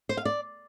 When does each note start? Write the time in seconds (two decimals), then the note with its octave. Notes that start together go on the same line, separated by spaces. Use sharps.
0.09 C5
0.17 F5
0.25 D5